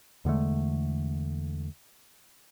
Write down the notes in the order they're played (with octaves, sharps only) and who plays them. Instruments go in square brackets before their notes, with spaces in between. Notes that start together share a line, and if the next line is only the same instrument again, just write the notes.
[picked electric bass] E2 D3 G#3 A3